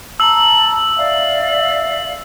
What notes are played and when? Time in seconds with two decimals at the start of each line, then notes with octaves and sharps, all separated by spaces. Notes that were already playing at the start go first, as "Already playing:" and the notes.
0.20 A5 A#5 E6 F#7
0.97 D5 E5 F5